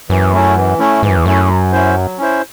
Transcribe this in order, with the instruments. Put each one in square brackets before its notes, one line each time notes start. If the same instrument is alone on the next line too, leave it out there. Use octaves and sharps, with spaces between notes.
[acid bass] F#2 [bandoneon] E3
[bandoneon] A3 C#4 E4
E3
A3 C#4 E4
[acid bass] G#2 [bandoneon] E3
[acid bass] F#2
E2
[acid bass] F#2 [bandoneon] A3 C#4 E4
[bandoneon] F#3
C#4 E4 C5
F#3
C#4 E4 C5